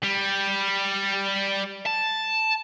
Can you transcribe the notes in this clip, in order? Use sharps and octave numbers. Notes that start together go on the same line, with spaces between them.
G3
A5